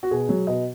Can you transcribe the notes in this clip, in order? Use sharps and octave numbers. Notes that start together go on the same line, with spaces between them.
F#4
B2 G#4
F#3
B2 D#5